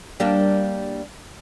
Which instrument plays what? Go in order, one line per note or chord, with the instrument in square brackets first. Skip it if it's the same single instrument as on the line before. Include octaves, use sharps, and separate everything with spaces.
[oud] G3 A#3 D4